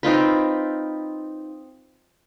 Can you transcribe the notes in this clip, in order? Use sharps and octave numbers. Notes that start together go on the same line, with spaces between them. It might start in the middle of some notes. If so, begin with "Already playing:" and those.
C4 D#4 F4 B4